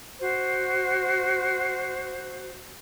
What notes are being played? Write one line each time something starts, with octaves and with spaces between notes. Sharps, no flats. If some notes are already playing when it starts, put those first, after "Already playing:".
F#4 C5